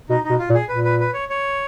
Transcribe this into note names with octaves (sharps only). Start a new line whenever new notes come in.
B2 D#4
D#4
B2
F4
A#2
G#4
A#2 B4
B4
B4
C#5
C#5